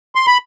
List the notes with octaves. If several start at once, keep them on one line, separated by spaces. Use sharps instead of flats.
C6
B5